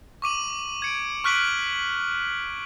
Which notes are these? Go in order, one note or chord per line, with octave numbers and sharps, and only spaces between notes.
C#6 D6 D#7 F#7
G#6 C#7 D7
C#6 F6 F#6 B6 D7 F#7